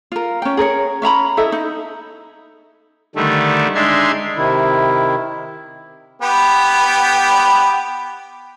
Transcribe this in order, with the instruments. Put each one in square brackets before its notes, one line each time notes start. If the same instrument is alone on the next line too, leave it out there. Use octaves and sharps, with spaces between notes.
[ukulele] F4 A#4
C#4 G5
G#4 A#4 B4 C#5
C#4 E5 A#5 B5
E4 A4 D#5 E5
D#4
[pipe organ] D3 D#3 G3 A3
G#3 D4 D#4 E5 C6 G#6
[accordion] C3 D#3 E4
[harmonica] B3 G4 B4